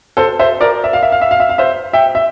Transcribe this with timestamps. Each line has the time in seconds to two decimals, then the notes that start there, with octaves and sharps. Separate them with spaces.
0.17 A4 C5
0.39 C5 E5
0.61 A#4 D5
0.84 E5
0.93 F5
1.03 E5
1.12 F5
1.22 E5
1.31 F5
1.40 E5
1.49 F5
1.58 C5 E5
1.93 E5 G5
2.15 E5